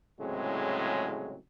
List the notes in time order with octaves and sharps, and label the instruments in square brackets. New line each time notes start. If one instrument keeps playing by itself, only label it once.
[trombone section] C2 A2 C#3 F#3 G#3 C4